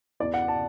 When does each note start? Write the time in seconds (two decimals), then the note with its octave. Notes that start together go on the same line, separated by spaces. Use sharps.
0.20 E2 E3 D5
0.34 F#5
0.48 A5